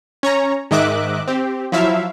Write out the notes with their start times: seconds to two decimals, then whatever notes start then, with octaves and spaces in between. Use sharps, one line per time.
0.23 C#4 C#5 A#5
0.71 G#2 D#3 D#5 E5 D6 F#6
1.28 C4 G4
1.72 F3 F#3 E4 E5 F5